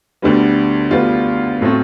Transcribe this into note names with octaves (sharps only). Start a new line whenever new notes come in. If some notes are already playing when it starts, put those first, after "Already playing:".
D2 D3 G3 B3
D2 D3 G3 B3 F4
A2 F#3 A3 C4